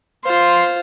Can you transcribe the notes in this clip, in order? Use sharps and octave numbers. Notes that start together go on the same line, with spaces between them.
F4 C5